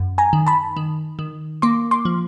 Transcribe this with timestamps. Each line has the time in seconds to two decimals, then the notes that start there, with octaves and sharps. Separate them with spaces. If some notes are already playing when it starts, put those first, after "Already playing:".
Already playing: F#2
0.18 G#5 A#5
0.33 D#3
0.47 A5 B5
0.77 D#3
1.19 D#3
1.62 A#3 C6 D6
1.91 C6 D6
2.05 F3